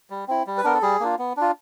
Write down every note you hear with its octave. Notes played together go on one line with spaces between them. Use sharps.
G3
C4 E4
G3
B4
B3 D4 A#4
A4
G3 G#4
A#3 D4 F4
B3
D4 F4